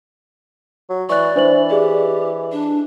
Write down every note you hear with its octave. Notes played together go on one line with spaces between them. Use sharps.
F#3
E3 D5 C#6 F#6
E3 D4 C5 F#7
E3
G4 G#4 D5 D#5
D4